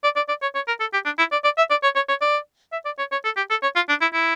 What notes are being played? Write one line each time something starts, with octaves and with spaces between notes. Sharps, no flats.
D5
D5
D5
C#5
C#5
A#4
A4
G4
D4
E4
D5
D5
E5
D5
C#5
C#5
C#5
D5
E5
D5
C#5
C#5
A4
G4
A4
C#5
F4
D4
E4
E4